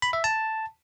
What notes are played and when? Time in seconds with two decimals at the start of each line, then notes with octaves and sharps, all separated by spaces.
0.02 B5
0.13 E5
0.24 A5